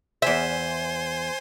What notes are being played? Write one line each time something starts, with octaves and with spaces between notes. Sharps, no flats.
E2 C5 E5 G#5 C6